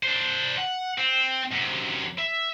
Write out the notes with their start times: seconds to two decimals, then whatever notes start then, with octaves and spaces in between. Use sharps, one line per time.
0.03 D4 C5
0.58 F#5
0.98 C4
1.52 F#2 C3
2.19 E5